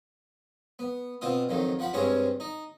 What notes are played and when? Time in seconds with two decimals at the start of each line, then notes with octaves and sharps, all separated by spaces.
0.79 B3
1.21 B2 C4 F4 D#6
1.49 F2 D#3 F#3
1.79 F3 F#5 B5
1.93 G2 G#3 C4 C#4 C#5
2.40 D#4